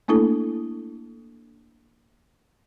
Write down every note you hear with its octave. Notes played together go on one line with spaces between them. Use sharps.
A3 A#3 D4 E4 A4